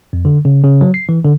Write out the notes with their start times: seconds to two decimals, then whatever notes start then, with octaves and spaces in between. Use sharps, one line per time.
0.13 F2
0.25 D3
0.45 C#3
0.64 C#3
0.81 F#3
0.94 C7
1.09 E3
1.25 D3